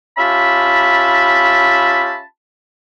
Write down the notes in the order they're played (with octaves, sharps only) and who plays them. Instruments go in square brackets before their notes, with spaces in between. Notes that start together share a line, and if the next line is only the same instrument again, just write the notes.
[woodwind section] C#4 F4 G4 E5 A5 B5